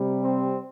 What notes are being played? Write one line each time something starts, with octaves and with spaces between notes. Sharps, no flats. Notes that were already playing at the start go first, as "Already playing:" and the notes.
Already playing: C3 G3
C4